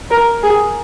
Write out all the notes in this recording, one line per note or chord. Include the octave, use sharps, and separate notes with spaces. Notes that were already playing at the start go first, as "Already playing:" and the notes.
A#4
G#4